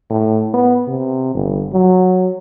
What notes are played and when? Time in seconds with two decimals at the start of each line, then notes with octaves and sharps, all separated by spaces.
0.10 A2
0.54 B3
0.88 C3
1.34 G1
1.73 F#3